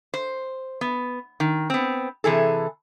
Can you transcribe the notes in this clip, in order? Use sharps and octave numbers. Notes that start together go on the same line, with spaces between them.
C5
B3
D#3
B3 C4
C3 E3 G#4 A4